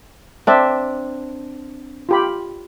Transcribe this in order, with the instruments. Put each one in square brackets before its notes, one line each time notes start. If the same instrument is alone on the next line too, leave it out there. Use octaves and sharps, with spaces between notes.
[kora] C4 D4 [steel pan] D5 E5
[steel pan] F4 G4 B5